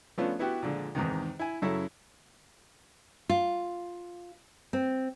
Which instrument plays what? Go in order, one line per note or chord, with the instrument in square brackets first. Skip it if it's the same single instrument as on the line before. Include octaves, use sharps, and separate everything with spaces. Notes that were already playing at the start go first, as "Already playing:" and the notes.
[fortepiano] F3 A3 B3 C#4 D4 F4
B3 E4 F#4 G4
A#2 D3 F3 G#3
E2 G#2 C3 D#3
E4 G#5
F#2 C#3 F#3 E4 A4 C#5
[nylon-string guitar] F4
C4